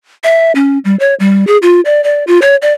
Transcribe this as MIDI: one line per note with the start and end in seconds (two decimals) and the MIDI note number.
0.24 0.52 76
0.55 0.78 61
0.85 0.96 55
1.00 1.14 73
1.20 1.46 55
1.47 1.57 68
1.62 1.81 65
1.85 2.03 74
2.04 2.24 74
2.27 2.39 65
2.42 2.56 73
2.62 2.72 74